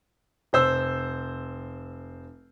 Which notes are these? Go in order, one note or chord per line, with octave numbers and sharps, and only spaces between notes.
F1 C5 E6